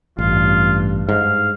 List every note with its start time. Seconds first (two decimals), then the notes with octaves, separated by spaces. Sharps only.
0.19 A1 G2 F4
1.09 G#2 F5